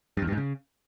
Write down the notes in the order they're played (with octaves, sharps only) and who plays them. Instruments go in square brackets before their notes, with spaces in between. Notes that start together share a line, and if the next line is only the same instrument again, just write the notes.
[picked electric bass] G2
E2
G2
G#2
C#3